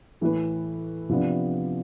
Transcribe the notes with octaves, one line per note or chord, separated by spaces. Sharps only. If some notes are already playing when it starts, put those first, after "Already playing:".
A2 E3 A3 E4 B4
C3 F3 B3 D4